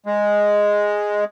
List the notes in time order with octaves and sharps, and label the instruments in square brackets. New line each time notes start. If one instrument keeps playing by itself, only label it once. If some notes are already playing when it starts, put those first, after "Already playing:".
[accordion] G#3